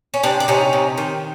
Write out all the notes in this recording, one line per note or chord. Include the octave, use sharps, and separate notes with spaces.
C#4
C3 C4 D4
D4
C3 C#4 D#4
C3
D#3